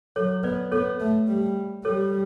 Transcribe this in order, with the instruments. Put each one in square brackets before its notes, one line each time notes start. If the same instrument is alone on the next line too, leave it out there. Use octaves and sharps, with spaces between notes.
[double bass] F#3 [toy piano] A4 C#5
[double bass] B3 [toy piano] B4 D5
[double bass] B3 [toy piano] A4 C#5
[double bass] A3
G3
[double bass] G3 [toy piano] A4 C#5